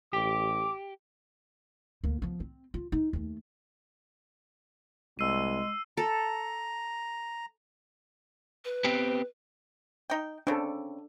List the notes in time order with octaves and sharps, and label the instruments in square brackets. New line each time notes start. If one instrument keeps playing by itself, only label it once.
[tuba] A1 [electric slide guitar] G4 [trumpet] D6
[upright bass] D2 A#3
F3 B3
C4
F4
D#4
D#2 A3
[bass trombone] C2 [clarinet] G#3 [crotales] E6 C7 D#7
[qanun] A4 [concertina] A#5
[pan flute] B4
[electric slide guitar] B3 C4 G4
[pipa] D#4 G5
[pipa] C#3 C4 [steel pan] D4 A4